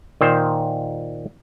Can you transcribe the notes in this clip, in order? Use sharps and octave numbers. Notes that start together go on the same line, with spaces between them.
A#2 D#3 C5